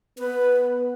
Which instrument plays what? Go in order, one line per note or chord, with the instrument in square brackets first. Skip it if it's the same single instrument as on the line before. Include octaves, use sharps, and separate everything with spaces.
[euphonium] B3 [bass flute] B4